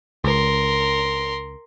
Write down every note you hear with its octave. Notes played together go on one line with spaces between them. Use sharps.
C#2 A#4 C6